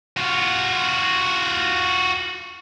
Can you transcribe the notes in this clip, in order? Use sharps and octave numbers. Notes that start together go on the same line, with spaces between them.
F4 F#4